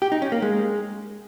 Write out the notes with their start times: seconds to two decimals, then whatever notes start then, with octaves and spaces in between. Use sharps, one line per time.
0.02 G4
0.12 D#4
0.22 C#4
0.32 A#3
0.42 G#3